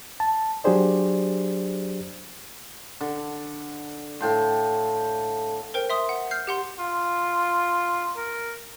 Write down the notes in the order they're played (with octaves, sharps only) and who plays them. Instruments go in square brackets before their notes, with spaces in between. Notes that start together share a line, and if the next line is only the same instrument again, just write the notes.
[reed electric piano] A5
F#3 D4 G4 G#4 C5 D5
[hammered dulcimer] D3
[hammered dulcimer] A2 G5 C6 [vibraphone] A4 F5 A5
[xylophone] A#4 C5 G5
E5 C6 D#6
F#5
F6 G6 C7
G4 F#5 C6
[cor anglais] F4
A#4